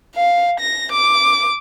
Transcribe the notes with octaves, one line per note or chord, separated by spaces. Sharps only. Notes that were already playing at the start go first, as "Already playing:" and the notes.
F5
A#6
D6